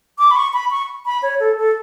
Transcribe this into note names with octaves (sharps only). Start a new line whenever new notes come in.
D6
B5
C#6
B5
C#6
B5
C#5
A4
A4